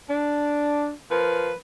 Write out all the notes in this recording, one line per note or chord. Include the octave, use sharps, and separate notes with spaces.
D4
F3 A#4 B4